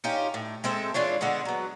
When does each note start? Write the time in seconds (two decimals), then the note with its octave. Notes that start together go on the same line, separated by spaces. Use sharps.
0.04 C#4 D#4 F4 G4
0.34 A2
0.64 G#3 C4 A4 E5
0.94 E3 D4 F4 C#5
1.21 D3 G#3 B3 D4
1.45 F#3 B3